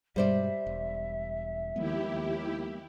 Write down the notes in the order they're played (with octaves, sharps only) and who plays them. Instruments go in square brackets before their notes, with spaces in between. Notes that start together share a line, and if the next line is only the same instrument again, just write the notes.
[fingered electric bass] G2 B2 G#3 [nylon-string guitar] G3 C5 D5 [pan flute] E5
[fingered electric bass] E1
[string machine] D#2 E4 G4 [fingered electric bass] F3 G#3 B3